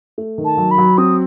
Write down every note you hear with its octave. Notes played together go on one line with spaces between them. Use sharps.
A3
D#3
A5
F#3
B5
F#3
C4 D#6